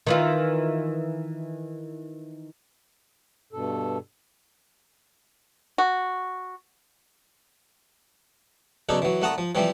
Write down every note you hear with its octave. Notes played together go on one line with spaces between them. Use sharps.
D#3 E3 F4
G2 B2 A4
F#4
B1 C#3 D4 D#4 A4
E3 F#3
C2 A3 F#5 A5 A#5 D#6
F3
C3 E3 F3 G3 C4